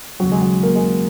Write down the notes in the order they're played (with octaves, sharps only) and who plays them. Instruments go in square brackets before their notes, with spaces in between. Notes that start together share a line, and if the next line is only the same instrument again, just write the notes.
[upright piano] D#2 C#3 F#3
G#3
F#3
A#3
G#3